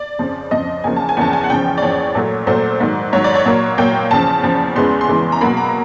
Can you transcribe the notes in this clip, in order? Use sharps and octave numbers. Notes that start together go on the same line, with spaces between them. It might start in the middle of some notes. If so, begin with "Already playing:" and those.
Already playing: D5
F2 C#3 F3
F2 C#3 F3 D#5
E2 C#3 F3 A#3 G#5
A5
G#5
E2 C#3 F3 A#3 A5
G#5
F#5
E2 C#3 F3 G5
D5
E2 C#3 F3 C#5
A#2 F#3 A3
A#2 F#3 A3 C5
G#2 D#3 F#3
G#2 D#3 F#3 C#5
D5
C#5
A#2 F#3 A#3
A#2 F#3 A#3 G5
E2 C#3 F3 A5
E2 C#3 F3
E2 C#3 E3 G#3 B3 C6
C6
E2 C#3 E3 G#3 B3
A#5
B2 F#3 A#3 B5
A#5